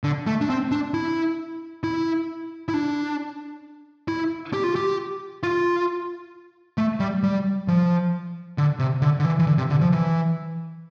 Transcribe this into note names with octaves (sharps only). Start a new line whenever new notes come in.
D3
A3
D4
C4
D4
E4
E4
E4
D4
E4
G4
F4
G4
F4
A3
G3
G3
F3
D3
C3
D3
D3
E3
E3
D3
C3
D3
F3
E3